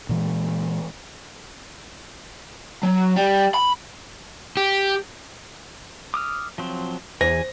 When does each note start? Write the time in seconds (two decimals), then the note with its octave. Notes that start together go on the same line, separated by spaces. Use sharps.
0.09 A#2 E3 G#3
2.83 F#3
3.16 G3
3.54 B5
4.57 G4
6.14 D6 D#6 F6
6.58 F3 F#3 C4
7.21 E2 C5 G#5 A#6